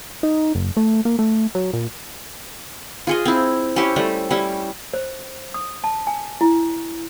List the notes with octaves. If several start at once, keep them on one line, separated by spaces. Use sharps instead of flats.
D#4
F#1
A3
A#3
A3
F#3
A#2
F4 G#4 D#5
C4 E4
C#4 E4 G4 C5
G3 A3
G3 C#4 E4
C5
D#6
A5
G#5
E4